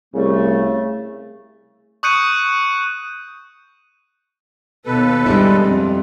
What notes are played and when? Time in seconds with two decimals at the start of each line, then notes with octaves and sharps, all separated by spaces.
0.14 C2 C#3 A3
2.03 C#6 D#6 F#6 G6 C#7 D#7
4.86 D#2 B2 A4 B4
5.26 G2 G3 G#3 E4
5.64 F2